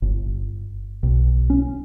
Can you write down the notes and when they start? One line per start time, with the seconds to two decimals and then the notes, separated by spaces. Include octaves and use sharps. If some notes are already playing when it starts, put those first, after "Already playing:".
0.02 G1
1.03 B1
1.50 C#4